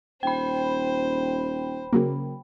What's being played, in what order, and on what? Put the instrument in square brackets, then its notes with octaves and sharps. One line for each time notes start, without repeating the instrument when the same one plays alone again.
[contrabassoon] D#1 [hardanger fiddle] C5 [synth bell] G5 B5
[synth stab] C#3 F#3 A#3